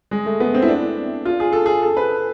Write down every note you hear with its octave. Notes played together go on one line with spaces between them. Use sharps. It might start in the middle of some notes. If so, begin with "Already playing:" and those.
G#3
A3
B3
C4
E4
D4
F4
G#4
A4
G#4
A4
B4